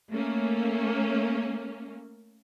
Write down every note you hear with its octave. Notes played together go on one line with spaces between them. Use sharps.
A3 A#3 C#4